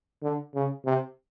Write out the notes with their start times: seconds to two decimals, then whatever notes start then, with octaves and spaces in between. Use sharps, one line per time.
0.23 D3
0.55 C#3
0.86 C3